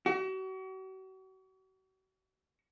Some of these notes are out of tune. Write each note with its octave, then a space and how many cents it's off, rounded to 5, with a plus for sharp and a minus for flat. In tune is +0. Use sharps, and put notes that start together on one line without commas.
F#4 +40